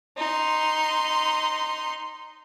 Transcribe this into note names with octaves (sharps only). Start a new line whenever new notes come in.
D#4 C6